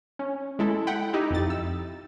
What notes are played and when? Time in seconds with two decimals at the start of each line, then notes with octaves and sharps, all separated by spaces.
0.19 C#4
0.59 G#3 E4 A4
0.87 F#5 G5 B5
1.13 D#4 E4 G4
1.30 F2 A6
1.50 E6